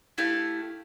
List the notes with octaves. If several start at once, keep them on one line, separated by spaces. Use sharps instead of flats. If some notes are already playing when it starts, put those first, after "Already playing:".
A3 E4 G4 F5